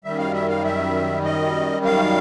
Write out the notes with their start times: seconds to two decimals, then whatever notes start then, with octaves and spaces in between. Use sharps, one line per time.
0.04 F#2 D#3 G3 E5
0.18 F5
0.34 E5
0.49 F5
0.64 E5
1.24 D#5
1.85 F5